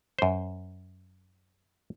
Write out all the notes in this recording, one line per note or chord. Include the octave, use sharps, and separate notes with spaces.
F#2 C5